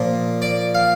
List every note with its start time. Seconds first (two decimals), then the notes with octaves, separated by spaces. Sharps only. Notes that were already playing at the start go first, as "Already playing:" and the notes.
Already playing: A#2 F3
0.42 D5
0.75 F5